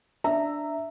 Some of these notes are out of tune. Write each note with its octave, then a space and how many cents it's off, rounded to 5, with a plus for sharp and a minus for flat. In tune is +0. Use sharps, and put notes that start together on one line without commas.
D4 +0 E5 +0 A#5 -15